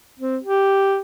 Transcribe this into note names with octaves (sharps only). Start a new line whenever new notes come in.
C4
G4